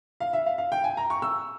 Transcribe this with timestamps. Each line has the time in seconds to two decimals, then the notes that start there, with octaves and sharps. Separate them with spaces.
0.20 F5
0.33 E5
0.46 F5
0.58 F5
0.72 G5
0.84 G#5
0.97 A#5
1.10 C#6
1.22 E6